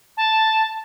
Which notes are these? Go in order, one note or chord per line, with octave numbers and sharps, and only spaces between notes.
A5